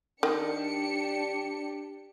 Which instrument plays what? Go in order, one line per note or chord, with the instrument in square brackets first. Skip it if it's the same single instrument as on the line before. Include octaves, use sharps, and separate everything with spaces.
[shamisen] D#3 [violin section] D4 G4 C#7